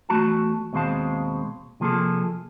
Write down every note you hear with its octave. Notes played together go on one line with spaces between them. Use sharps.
E2 E3 A3 F#4 A5
D#2 B2 G#3 C4 F5 A5
C3 F3 A#3 G#4 A4